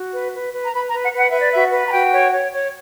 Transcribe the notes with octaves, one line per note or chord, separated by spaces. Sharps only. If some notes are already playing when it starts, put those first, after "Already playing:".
Already playing: F#4
B4
B4
B4
A#5
B4 B5
A#5
B4
F#5
B4 F#5
B4 E5
D5
F#4 E5
B4
A#5
F#4 G5
C#5
C#5
C#5